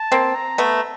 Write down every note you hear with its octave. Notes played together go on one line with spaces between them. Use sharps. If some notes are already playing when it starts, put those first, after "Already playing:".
Already playing: A5
A#3 C4
A#5
A3 B3